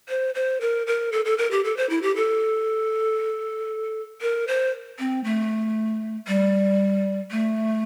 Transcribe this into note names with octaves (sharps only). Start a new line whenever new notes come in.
C5
C5
A#4
A#4
A4
A4
A#4
G4
A4
C5
E4
G4
A4
A#4
C5
C4
A3
G3
A3